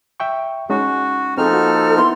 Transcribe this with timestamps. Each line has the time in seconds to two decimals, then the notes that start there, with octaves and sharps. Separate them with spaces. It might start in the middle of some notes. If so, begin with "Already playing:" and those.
0.20 E5 G5 C#6
0.70 G#3 C#4 D#4 F#4
1.38 F3 C4 D#4 G#4 A4 F6
1.51 A#3 F#4
1.97 B3 E4 C6